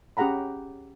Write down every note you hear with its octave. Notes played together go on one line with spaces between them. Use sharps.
C#4 G4 G#4 F#5 A#5 B5